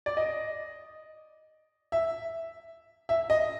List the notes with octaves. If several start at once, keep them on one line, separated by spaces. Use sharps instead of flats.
D5
D#5
E5
E5
D#5